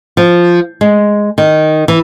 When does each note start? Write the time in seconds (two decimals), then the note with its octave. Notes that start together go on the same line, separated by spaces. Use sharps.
0.17 F3
0.81 G#3
1.38 D#3
1.88 E3